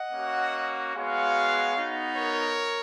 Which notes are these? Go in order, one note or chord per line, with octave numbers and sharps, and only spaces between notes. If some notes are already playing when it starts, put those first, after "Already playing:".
Already playing: D#5 F#5
A#3 C#4 F#4
G#3 B3 F#4 C#5 F5
B3 D#4 F#4
A#4 C#5